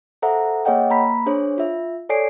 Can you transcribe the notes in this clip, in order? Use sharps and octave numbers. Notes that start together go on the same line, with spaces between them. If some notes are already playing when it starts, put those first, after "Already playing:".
A4 C5 E5 F#5 A#5
A#3 G#4 C#5 D#5 F#5 G5
A#3 A#5 B5 B6
D4 G#4 C5 C#5
F4 E5
A4 C#5 D5 G#5 C7 D7